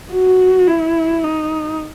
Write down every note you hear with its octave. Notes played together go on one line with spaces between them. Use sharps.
F#4
E4
D#4